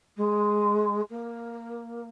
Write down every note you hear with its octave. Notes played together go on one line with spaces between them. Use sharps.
G#3
A#3